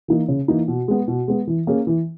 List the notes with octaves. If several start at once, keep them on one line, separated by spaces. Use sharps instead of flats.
E3 A#3 D#4
C#3
E3 A#3 D#4
B2
G#3 B3
B2
G#3 B3
E3
A#3 C#4 G#4
E3